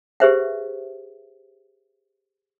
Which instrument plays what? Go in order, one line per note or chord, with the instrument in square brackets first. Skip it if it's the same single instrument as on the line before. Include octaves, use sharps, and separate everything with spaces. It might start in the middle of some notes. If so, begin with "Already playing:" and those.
[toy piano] G4 G#4 B4 C5 E5 F#5